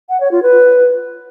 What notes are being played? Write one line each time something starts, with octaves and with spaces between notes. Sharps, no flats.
F#5
C#5
F4
B4